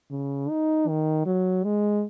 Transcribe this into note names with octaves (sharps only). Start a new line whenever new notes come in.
C#3
D#4
D#3
F#3
G#3